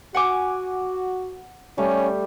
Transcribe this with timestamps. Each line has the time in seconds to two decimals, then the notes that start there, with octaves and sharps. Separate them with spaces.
0.15 F#4 F#5 G#5 D6
1.78 G3 A3 C#4